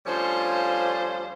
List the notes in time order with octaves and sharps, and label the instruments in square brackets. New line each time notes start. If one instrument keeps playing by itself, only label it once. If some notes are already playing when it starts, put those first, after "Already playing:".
[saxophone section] D2 F3 G3 C#4 F4 C5